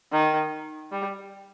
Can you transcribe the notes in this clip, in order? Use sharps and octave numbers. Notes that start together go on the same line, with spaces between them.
D#3
G3